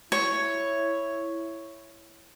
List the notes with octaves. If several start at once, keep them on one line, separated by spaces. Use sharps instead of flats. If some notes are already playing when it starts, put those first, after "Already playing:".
E4 C#5